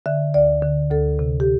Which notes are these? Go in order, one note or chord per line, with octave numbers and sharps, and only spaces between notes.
D3 E5
D2 D5
D3
D2 A4
C3
G4